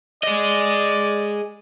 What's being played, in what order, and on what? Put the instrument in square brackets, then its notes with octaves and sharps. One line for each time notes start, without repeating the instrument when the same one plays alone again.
[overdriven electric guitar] G#4 D#5 [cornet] D5